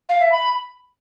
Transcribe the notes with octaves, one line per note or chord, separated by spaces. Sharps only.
F5
E5
B5